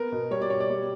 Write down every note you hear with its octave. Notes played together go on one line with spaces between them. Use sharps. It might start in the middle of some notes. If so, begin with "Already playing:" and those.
Already playing: B3 A#4
B2
G3 C#5
D5
B2 C#5
D5
G3